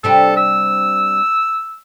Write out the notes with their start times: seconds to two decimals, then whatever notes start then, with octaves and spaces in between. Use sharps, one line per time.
0.04 C3 G3 D4 A4
0.37 E6